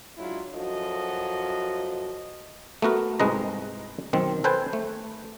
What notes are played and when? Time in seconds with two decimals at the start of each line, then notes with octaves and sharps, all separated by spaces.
0.18 F#3 G#3 D4 E4 F4
0.54 F#2 F3 F#4 A4 D#5
2.82 A3 B3 F#4 A#4
3.20 C2 G#2 G#3 B4 D#5 A#5
4.13 B1 D#3 C4
4.44 A4 B4 C5 G5 G#5
4.73 A3